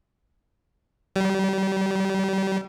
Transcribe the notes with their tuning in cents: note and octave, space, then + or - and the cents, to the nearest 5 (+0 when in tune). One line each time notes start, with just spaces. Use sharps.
G3 -30